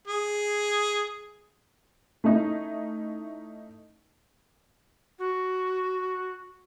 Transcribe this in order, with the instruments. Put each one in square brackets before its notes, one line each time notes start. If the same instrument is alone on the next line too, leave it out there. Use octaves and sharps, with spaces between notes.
[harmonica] G#4
[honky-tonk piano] A3 C#4 D#4 E4
[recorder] F#4